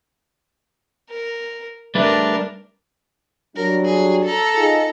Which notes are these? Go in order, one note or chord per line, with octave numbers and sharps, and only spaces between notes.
A#4
G3 A3 D4 A#4 B4
F#3 G3 D4 A#4
G#4
A4 A#5
D#4 F4 G#4